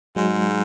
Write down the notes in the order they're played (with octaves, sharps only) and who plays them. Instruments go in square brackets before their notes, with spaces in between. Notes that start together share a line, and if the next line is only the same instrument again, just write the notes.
[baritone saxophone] G#2 [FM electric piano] F#3 G#3